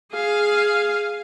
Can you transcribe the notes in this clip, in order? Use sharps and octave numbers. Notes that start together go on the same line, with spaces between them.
G#4 F5